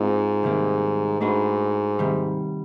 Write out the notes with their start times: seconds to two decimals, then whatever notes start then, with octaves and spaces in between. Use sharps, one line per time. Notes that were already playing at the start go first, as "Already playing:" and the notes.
Already playing: G#2 G#3 C4 F4
0.43 C3 D#3 G3 A#3
1.21 G#2 A3 D4 F#4 B4
1.99 C3 D#3 G3